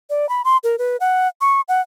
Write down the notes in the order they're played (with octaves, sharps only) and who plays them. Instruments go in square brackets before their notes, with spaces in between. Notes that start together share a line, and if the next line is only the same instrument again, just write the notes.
[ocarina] D5
B5
C6
A#4
B4
F#5
C#6
F#5